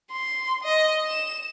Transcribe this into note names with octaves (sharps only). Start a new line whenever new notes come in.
C6
D#5
E7